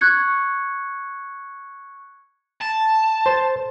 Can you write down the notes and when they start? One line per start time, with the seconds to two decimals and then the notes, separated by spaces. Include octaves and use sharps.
0.01 C#6 F#6 G#6 C#7
2.61 A5
3.26 C5